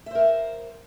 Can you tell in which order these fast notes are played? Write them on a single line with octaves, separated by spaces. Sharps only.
E5 C5 A#4 F5